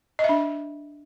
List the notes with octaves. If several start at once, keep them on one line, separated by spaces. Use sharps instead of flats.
D#5
E5
D4